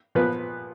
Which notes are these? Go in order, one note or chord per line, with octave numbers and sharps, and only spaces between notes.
A#2 F3 B3 B4